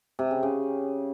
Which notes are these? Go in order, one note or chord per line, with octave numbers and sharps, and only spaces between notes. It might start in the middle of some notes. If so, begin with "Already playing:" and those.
C3
C#3
C#3